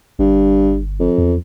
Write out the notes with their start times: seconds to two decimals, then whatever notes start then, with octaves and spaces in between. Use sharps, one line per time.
0.19 G1 G2
0.99 F2
1.18 E2